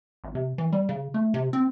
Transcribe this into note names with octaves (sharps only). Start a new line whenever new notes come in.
G#1
C3
E3
G3
C#3
A3
C3
C4